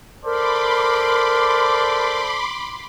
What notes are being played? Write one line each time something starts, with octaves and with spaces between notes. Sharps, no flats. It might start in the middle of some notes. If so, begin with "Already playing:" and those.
A4 A#4 C5 D5 B5 C6 D6